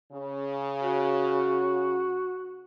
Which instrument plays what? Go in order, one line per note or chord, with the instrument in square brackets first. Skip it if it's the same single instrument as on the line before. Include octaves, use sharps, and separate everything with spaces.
[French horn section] C#3
[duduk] F#4